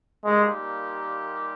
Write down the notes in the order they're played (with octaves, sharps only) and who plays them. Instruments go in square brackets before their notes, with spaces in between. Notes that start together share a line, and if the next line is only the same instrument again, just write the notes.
[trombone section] A#2 G3 A#3 D#4 G4 [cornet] G#3